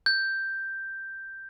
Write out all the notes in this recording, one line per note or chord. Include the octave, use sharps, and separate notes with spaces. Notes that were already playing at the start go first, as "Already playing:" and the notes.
G6